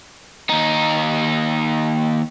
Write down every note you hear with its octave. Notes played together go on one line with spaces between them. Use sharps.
D#2 D#4